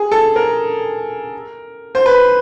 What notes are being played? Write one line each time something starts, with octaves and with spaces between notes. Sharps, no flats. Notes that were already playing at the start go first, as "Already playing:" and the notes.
Already playing: G#4
A4
A#4
C5
B4